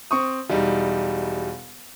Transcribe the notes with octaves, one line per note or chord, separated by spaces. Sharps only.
C4 C#6 D#6
E1 G3 D#4